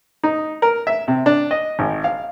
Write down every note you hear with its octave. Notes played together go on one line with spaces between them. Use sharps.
D#4
A#4
E5
C3
D4
D#5
G#1
F5